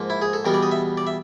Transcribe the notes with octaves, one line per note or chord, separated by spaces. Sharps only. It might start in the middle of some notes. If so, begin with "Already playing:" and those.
Already playing: G#2 F3 A#3
E4
G#4
A4
E2 B2 G3 B3 A#4
D5
D#5
E5
D5
E5